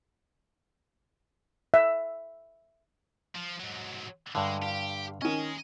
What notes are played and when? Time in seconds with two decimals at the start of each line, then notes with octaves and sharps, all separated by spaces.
1.74 E5
3.35 F3
3.60 G#2 F#3
4.35 G2 D3 G#3
4.62 G4 F5
5.22 D#3 C#4 D#5 G#5